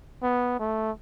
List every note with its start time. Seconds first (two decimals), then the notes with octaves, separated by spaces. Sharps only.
0.23 B3
0.59 A3